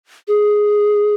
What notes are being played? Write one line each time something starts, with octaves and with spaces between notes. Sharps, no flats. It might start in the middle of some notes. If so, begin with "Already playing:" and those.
G#4